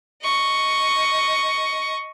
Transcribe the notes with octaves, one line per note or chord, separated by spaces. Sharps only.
D#5 C#6